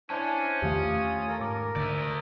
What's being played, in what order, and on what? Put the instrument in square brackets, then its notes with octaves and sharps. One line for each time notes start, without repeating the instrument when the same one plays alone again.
[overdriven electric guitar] C#4 [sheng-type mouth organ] D4 E4 C5 [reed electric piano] A5 G#6
[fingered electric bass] E2 D#3 A3 [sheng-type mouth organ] F4 D#6 [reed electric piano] G4 F5
[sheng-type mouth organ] A4 A#4
[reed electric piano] G#2 D6 [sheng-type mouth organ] A#4
[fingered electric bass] D2 D3 [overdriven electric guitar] D5 E5